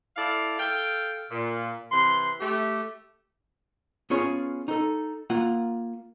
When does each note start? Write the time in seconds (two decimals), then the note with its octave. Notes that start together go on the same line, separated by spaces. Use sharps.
0.16 E4 A4 D5 F5
0.59 A4 F5 G5
1.31 A#2
1.91 C3 E3 B4 C6
2.41 A3 G4
4.10 B3 C#4 F4 G#4 C#5
4.68 D#4 A4
5.30 A#3 F4 F#5